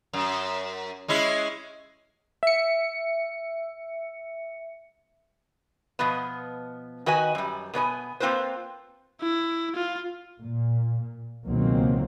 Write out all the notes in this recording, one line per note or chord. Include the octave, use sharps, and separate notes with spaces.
F#2
G#3 C#4 E4
E5 C#7
B2 F3 B3
D#3 F#4 B4 D#5 G#5
F#2 G3
B2 B3 C#5 G#5
A#3 C4 F4 B4 C5
E4
F4
A#2
C#2 B2 D#3 F#3 A#3 C4